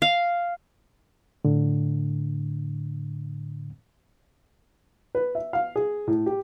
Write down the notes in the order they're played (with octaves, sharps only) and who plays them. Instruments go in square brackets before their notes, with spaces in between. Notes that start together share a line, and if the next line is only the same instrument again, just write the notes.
[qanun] F5
[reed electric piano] A2 D3
[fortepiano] B4
E5
F5
G#4
A2
G4